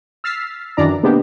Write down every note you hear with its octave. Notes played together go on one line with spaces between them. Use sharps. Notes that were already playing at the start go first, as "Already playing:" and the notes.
E6 F6 A6 B6 C7
F#2 D#3 E3 D4 D5 A#5
C3 G#3 A#3 B3 D4 G4